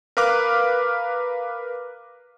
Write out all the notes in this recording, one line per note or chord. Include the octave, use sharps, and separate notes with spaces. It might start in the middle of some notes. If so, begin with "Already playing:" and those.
A#4 B4 F5 D6 F6 F#6